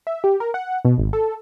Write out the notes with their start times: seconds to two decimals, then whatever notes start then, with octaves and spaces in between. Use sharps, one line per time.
0.07 E5
0.24 G4
0.40 A#4
0.54 F#5
0.85 B2
0.98 G#1
1.13 A4